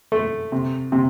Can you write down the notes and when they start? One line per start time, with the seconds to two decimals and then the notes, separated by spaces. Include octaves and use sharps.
0.12 A3
0.52 C3
0.92 C3